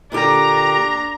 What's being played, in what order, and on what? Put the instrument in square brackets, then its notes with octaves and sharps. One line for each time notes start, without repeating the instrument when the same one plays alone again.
[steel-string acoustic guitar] A#2 D3 G4 [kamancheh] D4 A#5